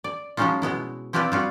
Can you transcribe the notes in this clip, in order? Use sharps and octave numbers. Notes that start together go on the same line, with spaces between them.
D5
F3 F#3 G#3 C#4 D#4 F4
B2 G#3 B3 E4
C4 E4 F4 G4 B4 D5
G3 F4 F#4